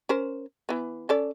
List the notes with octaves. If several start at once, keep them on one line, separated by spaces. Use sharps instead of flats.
C#4 A#4 C5
E3 B3
C#4 A4 D5